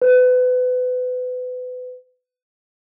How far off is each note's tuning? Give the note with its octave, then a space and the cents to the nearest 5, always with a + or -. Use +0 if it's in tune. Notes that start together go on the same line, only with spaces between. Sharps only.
B4 +30